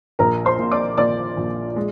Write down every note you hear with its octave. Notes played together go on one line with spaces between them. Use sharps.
A#1 A#4 A#5
C5 C6
A#2
D5 D6
A#2 D5 D6
A#1
G#3